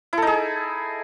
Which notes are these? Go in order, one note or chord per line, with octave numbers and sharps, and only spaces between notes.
D#4 E4 G#4 A4